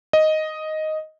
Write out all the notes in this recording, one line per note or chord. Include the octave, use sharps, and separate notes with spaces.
D#5